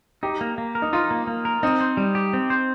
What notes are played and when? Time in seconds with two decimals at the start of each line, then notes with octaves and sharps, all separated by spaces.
0.23 D#4 G4
0.41 A#3
0.58 A#3
0.75 A#4
0.82 D#4
0.93 D#4 F4
1.11 A#3
1.27 A#3
1.45 A#4
1.63 C4 D#4
1.81 C5
1.97 G3
2.15 G4
2.33 C4
2.50 C5